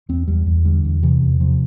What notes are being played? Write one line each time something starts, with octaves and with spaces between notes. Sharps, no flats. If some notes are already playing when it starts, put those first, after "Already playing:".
E2 C4
E2 G3
E2
D3 G3
E2
C3 E3
E2
C3 F3